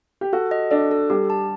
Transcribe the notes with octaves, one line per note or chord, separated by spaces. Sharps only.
G4
F#4 A4
D#5
D4 A4
A4
G3 G4
A5